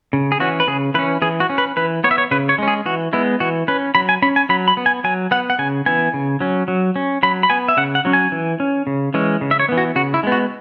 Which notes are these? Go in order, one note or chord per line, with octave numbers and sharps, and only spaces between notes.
C#3
G#4
E3 C#4 F#4
B4
C#3 G#4
E3 C#4 B4
E3 G#4
F#4
C#4
B4
E3 B4
B3 C#5
E5
C#5
C#3 B4
C#5
G#3 C#4
G#4
E3 F#4
G#3 B3 E4
E3 F#4
C#4 B4
F#3 B5
G#5
C#4 B5
G#5
F#3 B5
B5
B3
G#5
F#3 G#5
B3 F#5
F#5
C#3 G#5
E3 B3 G#5
C#3
F#3 C#4
F#3
C#4
F#3 B5
B5
B3 G#5
E5
C#3 F#5
F#5
F#3 C#4
G#5
E3
C#4
C#3
E3 G#3 C#4
C#3
E5
C#5
E3 B3
F#4
C#3 F#4
E4
G#3 B3
F#4